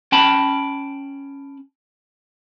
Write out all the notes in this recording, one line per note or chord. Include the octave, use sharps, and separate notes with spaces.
C#4 G5 A5 B5